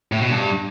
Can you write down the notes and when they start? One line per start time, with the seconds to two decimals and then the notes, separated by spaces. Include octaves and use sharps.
0.12 A2
0.21 B2
0.30 G2